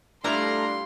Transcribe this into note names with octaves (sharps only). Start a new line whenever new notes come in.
G3 A3 D4 E4 F4 A#5 C6